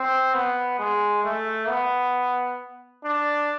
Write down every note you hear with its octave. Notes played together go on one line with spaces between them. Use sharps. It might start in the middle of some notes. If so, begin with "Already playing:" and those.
Already playing: C4
B3
G#3
A3
B3
D4